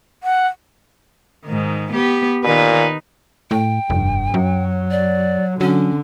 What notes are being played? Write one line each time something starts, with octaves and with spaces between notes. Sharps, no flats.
F#5
G#2 D#3
B3 G4
A#2 D#3 D#4 B4
A2 G5
F1 G2
F#2 F#3
D5
D3 F#3 C#4